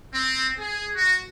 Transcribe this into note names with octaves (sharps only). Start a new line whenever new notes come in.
C4
G#4
F#4